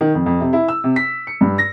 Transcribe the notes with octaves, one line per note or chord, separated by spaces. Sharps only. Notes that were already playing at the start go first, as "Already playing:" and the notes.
D#3
F2
F2
C3
E4
E6
C3
B6
C#7
G2
A#6